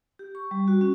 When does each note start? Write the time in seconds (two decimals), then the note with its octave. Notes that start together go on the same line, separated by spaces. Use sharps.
0.19 G4
0.35 C#6
0.51 G3
0.68 F#4
0.81 C#4